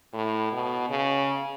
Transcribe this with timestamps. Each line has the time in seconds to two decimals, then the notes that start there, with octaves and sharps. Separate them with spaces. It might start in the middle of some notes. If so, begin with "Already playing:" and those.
0.13 A2
0.52 B2
0.90 C#3